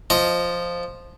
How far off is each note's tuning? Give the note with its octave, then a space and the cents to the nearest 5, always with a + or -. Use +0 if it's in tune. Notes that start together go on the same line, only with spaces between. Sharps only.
F3 +0 D#5 +0